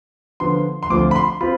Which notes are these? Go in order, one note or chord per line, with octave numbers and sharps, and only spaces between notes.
D3 F3 B3 F4 C6
C6
D2 D3 F3 C4 F4 D6
B5
C6
C4 F4 B5